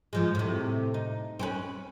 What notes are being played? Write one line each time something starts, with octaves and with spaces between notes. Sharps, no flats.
G#2 F3 G#3
A2 C3
D#4
C4 C#4 B4